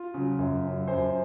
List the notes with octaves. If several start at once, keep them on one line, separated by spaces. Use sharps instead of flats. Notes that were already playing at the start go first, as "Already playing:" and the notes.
Already playing: F4
C#3 F#3
F#2
C#3 F#3
F#2 C5